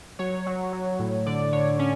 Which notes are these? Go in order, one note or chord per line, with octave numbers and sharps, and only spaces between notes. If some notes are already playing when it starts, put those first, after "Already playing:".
F#3 C#5
F#3
F#3
A2
D3 D5
D3 C#5
C#4